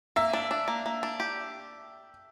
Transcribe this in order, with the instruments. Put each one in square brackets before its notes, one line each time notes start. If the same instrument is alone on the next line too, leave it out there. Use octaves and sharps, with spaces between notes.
[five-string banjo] A#3 [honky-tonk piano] E5
[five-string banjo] D4
D4
A#3
A#3
D4
G4